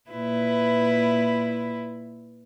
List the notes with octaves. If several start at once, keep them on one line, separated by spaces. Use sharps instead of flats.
A#2 E4 B4